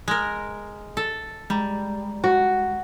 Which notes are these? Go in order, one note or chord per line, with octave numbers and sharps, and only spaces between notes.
G#3 A#4
A4
G3 G#3 A#5
F#4